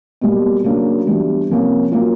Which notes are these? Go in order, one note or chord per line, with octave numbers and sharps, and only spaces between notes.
B2 G3 A#3
C#3 F#3 A#3 D4
E3 G3 B3 D4
C3 F3 A#3 C#4
F#3 A#3 C#4 F4